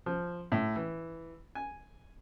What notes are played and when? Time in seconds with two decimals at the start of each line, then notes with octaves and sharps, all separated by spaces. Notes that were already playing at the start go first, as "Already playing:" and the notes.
0.06 F3
0.52 A2
0.76 E3
1.55 G#5